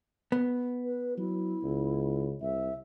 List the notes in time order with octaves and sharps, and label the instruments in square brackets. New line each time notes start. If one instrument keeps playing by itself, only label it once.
[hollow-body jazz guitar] B3
[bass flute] B4
[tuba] F#3 [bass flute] E4
[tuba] C#2
[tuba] C2 [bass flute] E5